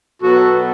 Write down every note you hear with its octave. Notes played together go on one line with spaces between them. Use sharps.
B2 F#3 B3 F#4 A4